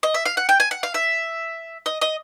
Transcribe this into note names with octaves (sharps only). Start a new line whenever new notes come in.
D#5
E5
F5
F#5
G5
G#5
F#5
F5
E5
D#5
D#5